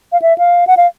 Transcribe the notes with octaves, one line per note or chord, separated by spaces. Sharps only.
F5
E5
F5
F#5
F5